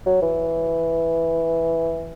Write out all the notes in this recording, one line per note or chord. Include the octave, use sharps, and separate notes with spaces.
F#3
E3